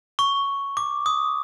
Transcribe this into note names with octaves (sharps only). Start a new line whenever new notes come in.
C#6
D6
D#6